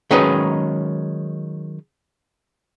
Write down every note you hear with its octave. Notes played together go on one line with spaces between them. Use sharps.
D#3 F#3 G#3 C#4 D#4 B4